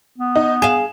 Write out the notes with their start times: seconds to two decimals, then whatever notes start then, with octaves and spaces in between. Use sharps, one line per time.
0.18 B3
0.36 D#4
0.62 G#4 F5 E7